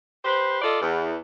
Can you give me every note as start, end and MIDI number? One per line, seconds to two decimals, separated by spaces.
0.24 0.61 67
0.24 0.61 71
0.24 0.61 72
0.62 0.79 65
0.62 0.79 69
0.62 0.79 74
0.62 0.79 75
0.80 1.15 40